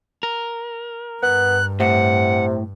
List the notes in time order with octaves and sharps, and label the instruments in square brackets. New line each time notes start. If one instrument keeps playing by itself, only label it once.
[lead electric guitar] A#4
[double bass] G2 [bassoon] B3 [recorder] F#6
[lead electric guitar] A2 [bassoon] C3 [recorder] F#5